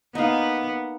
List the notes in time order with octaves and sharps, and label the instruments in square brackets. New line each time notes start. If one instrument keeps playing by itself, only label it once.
[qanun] A#3 D#4 [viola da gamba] B3 [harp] D#5 F5